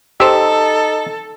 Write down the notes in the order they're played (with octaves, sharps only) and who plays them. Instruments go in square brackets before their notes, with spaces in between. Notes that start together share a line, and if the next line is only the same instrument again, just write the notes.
[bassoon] D#4 [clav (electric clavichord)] G4 C5 [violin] A4 [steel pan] E6